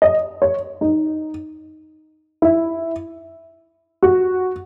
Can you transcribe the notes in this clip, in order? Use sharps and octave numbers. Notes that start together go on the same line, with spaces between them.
D#5
C#5
D#4
E4
F#4